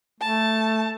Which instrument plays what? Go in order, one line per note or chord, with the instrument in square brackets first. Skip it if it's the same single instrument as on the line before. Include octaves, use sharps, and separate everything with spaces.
[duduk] A3 [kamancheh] A5